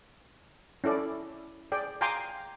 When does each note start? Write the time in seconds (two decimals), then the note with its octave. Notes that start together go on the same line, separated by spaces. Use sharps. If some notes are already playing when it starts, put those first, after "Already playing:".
0.84 C#4 E4 A4 D5
1.72 G#4 D5 G5
2.01 F5 G5 G#5 A#5 C6 D6